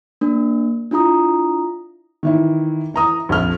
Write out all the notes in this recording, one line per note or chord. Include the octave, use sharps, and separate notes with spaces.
A#3 D4
D4 E4 F4 A#5 D#6
D#3 E3 E4
E3 A#5 D#6
A#1 F2 F6